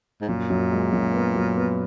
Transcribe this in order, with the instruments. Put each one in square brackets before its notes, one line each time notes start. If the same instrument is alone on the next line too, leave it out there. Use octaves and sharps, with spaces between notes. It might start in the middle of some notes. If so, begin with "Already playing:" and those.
[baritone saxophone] G#2
[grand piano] F#2 [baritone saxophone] A#2
[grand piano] F#2
G#3
F#2
B3
F#2
B3